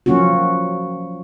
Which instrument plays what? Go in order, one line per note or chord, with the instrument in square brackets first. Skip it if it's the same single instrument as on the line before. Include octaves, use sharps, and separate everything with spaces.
[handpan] F3 F#3 A#3 C#4 F4 F#4